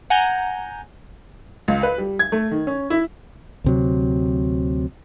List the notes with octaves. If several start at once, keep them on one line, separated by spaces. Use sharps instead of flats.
F#5 G#5 A#5 G6
C#2
B4
G3
G#6
A3
D#3
C#4
E4
D2 C3 F#3